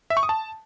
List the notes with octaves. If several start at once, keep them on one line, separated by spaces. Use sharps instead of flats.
E5
C#6
D#6
A5